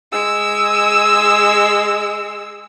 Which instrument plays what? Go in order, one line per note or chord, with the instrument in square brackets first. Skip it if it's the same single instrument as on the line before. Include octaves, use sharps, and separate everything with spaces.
[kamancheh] G#3 E6